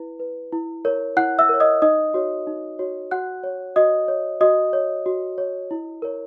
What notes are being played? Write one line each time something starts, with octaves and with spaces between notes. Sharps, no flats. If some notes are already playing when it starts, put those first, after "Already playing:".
Already playing: E4 B4
B4
E4
A#4 C#5
E4 F#5 F#6
E5 E6
A#4 C#5
D#5 D#6
D#4 D#5 D#6
F#4 C#5
D#4
F#4 C#5
F#4 F#5 F#6
C#5
F#4 D#5 D#6
C#5
F#4 D#5 D#6
C#5
F#4
C#5
E4
A#4 C#5